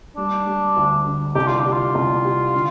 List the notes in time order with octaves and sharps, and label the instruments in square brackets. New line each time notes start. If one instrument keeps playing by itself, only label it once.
[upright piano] G3 [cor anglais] D4
[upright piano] G3
D2
D3
[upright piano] C2 [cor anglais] G4
[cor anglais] F4
[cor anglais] D4 [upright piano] G4
[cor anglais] F4
[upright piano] C2
G4
D3